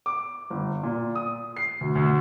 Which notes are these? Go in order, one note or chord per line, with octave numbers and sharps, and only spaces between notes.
D6
G1
A#2
D#6
C7
D2
D2